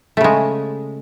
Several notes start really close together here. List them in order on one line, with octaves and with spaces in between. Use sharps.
A3 C#3 G#3